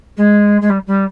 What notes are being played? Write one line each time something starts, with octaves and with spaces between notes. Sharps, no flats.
G#3
G#3
G3
G3